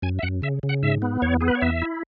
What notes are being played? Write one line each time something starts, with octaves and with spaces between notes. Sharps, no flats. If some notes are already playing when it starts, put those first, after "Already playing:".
F#2 G#5
E5
F#2 F#5
C#3 E5
C#3
F#5
G#2 E5
B3
E2 C#5
B3 G#4
B4
C#5
E2 E5
E4